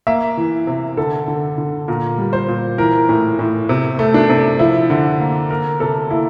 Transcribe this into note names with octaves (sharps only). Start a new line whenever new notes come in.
A#3 E5
E3
C3
D3 A4
D3
D3
A#2 A#4
G3
C5
A#2
E3 A#4
A2
A2
C3
A3
D4
C3
F3 E4
D3
A#3
A#3 A#4
C3 A4
A#3 E4